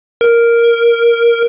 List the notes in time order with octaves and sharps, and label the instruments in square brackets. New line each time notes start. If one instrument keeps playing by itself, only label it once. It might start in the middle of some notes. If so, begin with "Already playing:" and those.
[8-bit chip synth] A#4